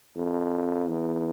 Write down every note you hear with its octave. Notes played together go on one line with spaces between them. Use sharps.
F2
E2